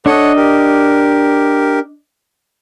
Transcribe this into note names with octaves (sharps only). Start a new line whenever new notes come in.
D4 A4 C#5 D#5 F#5
G4 A#4